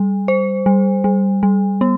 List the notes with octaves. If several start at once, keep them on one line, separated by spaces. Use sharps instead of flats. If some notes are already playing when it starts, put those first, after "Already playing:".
Already playing: G3
C5
G3
G3
G3
B3